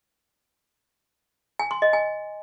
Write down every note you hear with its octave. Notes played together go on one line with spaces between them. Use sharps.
G#5
C6
D#5
G#5